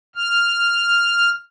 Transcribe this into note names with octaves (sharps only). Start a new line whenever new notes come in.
F6